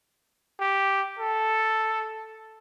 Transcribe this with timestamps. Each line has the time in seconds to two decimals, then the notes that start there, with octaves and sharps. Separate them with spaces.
0.60 G4
1.19 A4